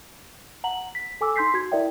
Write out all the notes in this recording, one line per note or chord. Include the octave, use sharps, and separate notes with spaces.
F#5 A#5 F#7
B6
A4 G#5 D6 E6
D#4 C6 G6 B6 C7
F#4 G#6
E4 A#4 D5 E5 G5